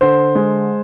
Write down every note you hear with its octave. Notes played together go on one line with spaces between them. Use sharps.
D3 C5
G#3